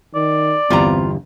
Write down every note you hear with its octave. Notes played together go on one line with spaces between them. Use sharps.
D#3 D5
G1 E2 G3 C4 F4 A#5